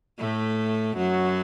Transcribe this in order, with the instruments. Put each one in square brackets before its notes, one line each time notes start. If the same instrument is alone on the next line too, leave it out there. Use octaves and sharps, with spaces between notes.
[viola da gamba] A2 A3
F#2 F#3